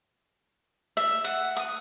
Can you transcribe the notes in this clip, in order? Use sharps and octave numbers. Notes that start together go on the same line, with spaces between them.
E5
F#5
D#6